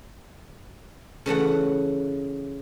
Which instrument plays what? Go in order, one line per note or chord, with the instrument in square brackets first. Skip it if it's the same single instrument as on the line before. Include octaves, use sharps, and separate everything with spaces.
[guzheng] C#3 E3 A3 F#5